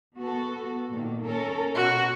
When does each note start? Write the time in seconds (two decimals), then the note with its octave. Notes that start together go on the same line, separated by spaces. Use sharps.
0.17 B3 F#4 A4
0.91 A#2 D#3 A#3
1.24 C#4 A4 A#4
1.75 B2 F#4